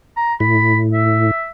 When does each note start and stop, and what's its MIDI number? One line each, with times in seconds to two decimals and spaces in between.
0.17 0.34 82
0.40 1.31 45
0.40 0.78 83
0.93 1.49 76